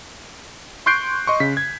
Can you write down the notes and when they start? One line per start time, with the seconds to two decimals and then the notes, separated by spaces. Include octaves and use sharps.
0.86 C6 C#6 F#6 G6 C7 D7
1.27 D#5 C6 C#6
1.40 C#3 B6
1.57 G#6